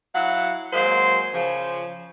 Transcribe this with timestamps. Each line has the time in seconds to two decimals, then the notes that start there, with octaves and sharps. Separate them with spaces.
0.15 F#3 E4 F5 F#5
0.72 F#3 G#3 A#3 C5
1.34 C#3 F3